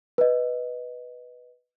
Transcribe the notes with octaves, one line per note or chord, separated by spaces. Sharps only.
B4 D#5